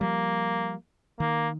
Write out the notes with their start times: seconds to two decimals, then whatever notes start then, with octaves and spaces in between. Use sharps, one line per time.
0.01 F3 G3 A#3
1.20 D#3 A#3